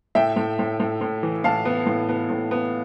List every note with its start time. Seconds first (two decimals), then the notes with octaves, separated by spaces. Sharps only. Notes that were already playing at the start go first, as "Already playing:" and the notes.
0.15 A2 E5 G5
0.36 A2
0.59 A2
0.80 A2
1.01 A2
1.23 E3
1.44 A2 F5 A5
1.65 B3
1.87 A2
2.09 B3
2.30 A2
2.51 B3